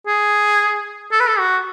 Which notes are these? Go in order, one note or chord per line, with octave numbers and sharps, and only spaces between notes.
G#4
A4
B4
A4
F#4